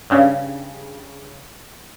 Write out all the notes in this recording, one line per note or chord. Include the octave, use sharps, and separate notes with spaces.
G2 C#3